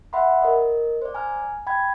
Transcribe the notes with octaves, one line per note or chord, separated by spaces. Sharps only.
E5 F#5 B5 C6
A#4 D#5
C5 D5
G#5 A#5 F6
G5 B5 G#6